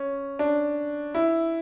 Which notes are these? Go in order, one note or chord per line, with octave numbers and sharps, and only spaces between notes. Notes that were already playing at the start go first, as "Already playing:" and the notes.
Already playing: C#4
D4
E4